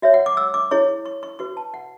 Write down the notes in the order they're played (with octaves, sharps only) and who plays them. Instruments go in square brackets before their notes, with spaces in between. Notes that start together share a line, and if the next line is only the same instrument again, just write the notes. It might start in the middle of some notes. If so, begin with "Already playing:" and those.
[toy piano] F#4 C#5 E5
F#5
D6
E6
D6
E4 G#4 C#5 C#6
C#6
C#6
F#4 B4 C#6
A5
F#5